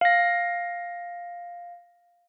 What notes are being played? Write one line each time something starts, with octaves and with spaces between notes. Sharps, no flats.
F5 A#6